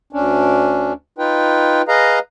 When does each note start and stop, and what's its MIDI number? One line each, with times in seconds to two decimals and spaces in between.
0.13 0.93 38
0.13 0.93 61
0.13 0.93 62
1.18 1.82 63
1.18 1.82 65
1.18 1.82 71
1.18 1.82 79
1.88 2.19 68
1.88 2.19 71
1.88 2.19 75
1.88 2.19 77
1.88 2.19 82